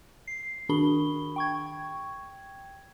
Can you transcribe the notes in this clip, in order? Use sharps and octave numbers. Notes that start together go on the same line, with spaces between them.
C7
D#3 D4 F#4 G#4 B5 G7
G5 C#6 G#6